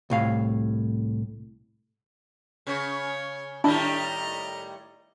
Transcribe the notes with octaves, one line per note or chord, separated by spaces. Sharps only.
C2 A2 F5
C#3 C#5
A2 D#3 G3 D4 E4 D#5 A#5